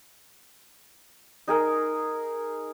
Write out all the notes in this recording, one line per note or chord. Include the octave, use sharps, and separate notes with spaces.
D#4 G#4 A#4